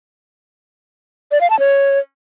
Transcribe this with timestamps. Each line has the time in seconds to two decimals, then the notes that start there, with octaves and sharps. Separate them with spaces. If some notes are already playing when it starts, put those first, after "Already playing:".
1.32 D5
1.41 F5
1.50 A5
1.59 C#5